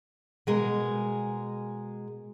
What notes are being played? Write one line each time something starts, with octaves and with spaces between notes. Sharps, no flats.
B2 G#3 G#4 A#4